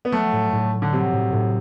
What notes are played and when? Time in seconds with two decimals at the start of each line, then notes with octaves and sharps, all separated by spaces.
0.05 B3
0.12 F#3 A3
0.32 A2
0.52 A2
0.73 A3
0.82 D3
0.93 C3 F#3
1.13 A2
1.33 A2